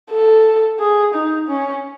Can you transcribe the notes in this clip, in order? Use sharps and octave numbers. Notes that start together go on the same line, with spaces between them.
A4
G#4
D#4
C#4